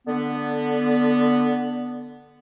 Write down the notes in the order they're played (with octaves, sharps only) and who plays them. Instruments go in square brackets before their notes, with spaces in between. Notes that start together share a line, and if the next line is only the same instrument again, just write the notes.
[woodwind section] D3 B3